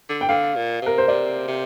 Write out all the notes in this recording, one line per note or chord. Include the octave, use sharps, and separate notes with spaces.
D3
G5
D3 F5
A#2
C3 A#4
C5
C3 D5
C3